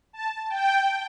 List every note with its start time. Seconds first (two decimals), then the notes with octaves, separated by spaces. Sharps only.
0.13 A5
0.50 G5